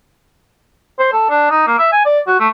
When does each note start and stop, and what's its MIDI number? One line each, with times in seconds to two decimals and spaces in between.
0.99 1.08 72
1.13 1.26 69
1.30 1.47 62
1.50 1.64 63
1.67 1.74 58
1.79 1.88 76
1.92 2.04 80
2.05 2.20 74
2.27 2.38 66
2.40 2.48 57